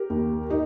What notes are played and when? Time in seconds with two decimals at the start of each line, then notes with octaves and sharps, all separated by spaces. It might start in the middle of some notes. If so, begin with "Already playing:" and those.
Already playing: G4 A#4
0.10 D#2
0.50 D#4 G4